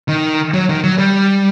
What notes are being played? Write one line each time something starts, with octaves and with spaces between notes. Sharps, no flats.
D#3
F#3
D#3
F#3
G3